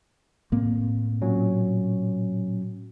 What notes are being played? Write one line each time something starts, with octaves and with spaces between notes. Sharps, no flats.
A2 A#3 C4
A#2 F#3 C#4